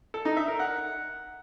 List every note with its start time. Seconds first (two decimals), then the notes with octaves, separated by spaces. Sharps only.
0.14 A4
0.25 D#4
0.37 E5
0.48 A#4
0.59 F#5